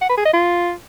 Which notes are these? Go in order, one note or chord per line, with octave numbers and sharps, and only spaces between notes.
F#5
B4
G#4
D#5
F4